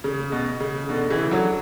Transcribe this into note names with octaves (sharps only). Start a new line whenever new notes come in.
C#3
B2
C#3
B2 D3
C#3 E3
D3 F#3